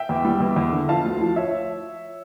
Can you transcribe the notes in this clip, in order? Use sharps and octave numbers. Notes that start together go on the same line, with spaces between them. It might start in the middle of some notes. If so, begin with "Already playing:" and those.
Already playing: E5 G5
E2
G3
E2
E2
D3
F3 F5 A5
D2
F3
C#5 E5